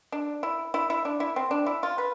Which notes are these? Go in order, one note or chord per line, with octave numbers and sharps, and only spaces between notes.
D4
E4
E4
E4
D4
E4
C4
D4
E4
F4
B4